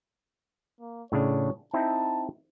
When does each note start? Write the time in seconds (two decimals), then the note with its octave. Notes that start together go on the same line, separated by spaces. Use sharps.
0.80 A#3
1.12 A2 C#3 D4 C#5
1.74 C4 D#4 E4 A5